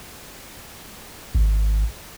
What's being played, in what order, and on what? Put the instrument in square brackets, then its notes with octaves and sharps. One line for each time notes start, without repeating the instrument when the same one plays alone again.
[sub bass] G#1